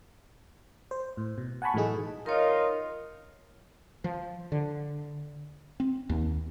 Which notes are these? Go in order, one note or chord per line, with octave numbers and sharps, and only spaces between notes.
C5
A2
B2
F#5 G#5 A5 B5 C#6
A2 E3 F#3 A3 D#4 G#4
D#4 F4 A#4 C#5 D#5
F3
D3
C4
D#2